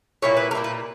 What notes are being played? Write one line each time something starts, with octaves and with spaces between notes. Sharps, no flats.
A#2 G3 A#3 E4 C#5
B4
A#4
A#2 G3 A#3 E4
B4